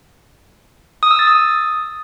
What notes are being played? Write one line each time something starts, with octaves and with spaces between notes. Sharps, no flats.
D#6
E6
A6
D#6